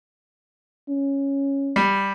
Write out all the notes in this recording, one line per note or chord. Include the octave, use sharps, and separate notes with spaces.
C#4
G3